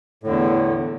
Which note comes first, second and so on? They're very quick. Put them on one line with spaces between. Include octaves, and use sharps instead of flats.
A2 D3 E2